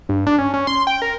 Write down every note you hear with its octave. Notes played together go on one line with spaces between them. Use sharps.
G2
D4
C#4
C#4
C6
G5
A#4